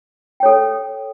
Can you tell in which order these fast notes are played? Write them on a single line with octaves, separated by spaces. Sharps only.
G5 C#5 A4